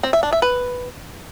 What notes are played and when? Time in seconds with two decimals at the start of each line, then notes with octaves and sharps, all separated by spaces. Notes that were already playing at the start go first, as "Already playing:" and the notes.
0.03 C4
0.13 E5
0.23 D4
0.33 E5
0.42 B4